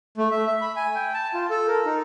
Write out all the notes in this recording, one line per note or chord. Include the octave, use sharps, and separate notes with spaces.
A3
E5
E5
B5
G#5
G5
A5
F4
A4
A#4
D#4